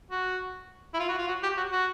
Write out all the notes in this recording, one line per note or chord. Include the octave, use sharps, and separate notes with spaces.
F#4
E4
F4
F#4
F4
F#4
G4
F#4
F#4